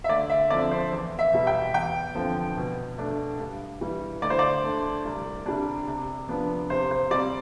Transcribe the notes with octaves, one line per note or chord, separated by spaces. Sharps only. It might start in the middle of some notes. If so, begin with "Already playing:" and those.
E5
D2 D5
E5
D3 F3 C4 D5
C5
E2
E5
B2 G3
G5
E2 G5
D3 F3 C4
B2
A3 D4
G2
E3 G3
D2 D5
C5
D5
D3 A3
C2
C3 G3 D4
C3
F3 B3 D4
C3 C5
C5
G3 C4 D5